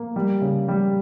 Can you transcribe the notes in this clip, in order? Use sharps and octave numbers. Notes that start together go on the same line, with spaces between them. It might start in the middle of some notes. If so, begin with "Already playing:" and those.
Already playing: A#3
G3
C#3
G3